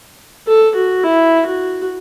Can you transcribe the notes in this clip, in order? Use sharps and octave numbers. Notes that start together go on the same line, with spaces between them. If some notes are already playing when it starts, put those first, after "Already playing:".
A4
F#4
E4
F#4